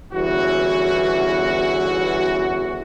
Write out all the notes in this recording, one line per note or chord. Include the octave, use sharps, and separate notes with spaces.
G1 E2 E3 C#4 E4 F#4